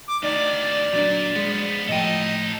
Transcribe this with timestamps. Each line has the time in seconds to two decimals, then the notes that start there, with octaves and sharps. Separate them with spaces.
0.08 D6
0.23 D2 D#3 D#4 D5
0.93 A#2 F#3 D4
1.36 F3 G#3 B3
1.88 A2 F3 D#4 A4 D#5 G5